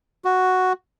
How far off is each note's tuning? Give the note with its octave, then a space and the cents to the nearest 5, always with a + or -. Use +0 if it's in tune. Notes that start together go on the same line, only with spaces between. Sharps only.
F#4 +0